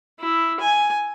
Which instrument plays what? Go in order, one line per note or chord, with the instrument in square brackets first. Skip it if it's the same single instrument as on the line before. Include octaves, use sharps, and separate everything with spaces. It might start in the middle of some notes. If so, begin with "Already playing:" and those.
[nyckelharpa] E4
G#5